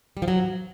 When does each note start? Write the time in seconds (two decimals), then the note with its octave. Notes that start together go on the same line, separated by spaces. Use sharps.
0.17 G3
0.22 F3
0.28 F#3